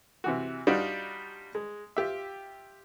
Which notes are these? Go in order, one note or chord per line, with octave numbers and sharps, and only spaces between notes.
C3 E3 F#4
G3 D4 D#4 F4 F#4
G#3
F4 G4 E5